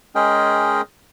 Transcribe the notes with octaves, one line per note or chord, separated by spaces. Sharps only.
G#3 C#4 G#4 A#4 D#5 G5